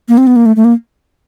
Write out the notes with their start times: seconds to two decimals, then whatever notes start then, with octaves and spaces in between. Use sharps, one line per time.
0.09 A#3
0.18 C4
0.27 B3
0.36 A#3
0.46 A3
0.56 A3
0.64 A#3